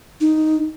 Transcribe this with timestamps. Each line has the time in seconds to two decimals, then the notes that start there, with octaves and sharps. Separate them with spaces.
0.21 D#4